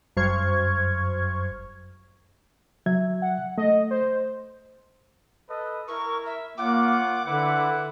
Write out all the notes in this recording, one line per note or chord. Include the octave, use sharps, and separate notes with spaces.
G1 F#2 C5 C#6 F6 G#6
F#3 E5 G#6
F#5
A3 D#5
C5
A4 B4 D#5
E4 A#4 C#6
E5
A#3 F4 C#5 F#5 D6
D3 E4 B4 F#5